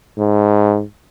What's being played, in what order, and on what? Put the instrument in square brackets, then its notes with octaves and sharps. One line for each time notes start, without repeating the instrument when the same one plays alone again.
[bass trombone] G#2